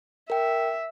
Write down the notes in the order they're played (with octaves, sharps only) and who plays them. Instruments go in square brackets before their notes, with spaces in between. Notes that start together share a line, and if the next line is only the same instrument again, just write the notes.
[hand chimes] A#4 G5 [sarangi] E5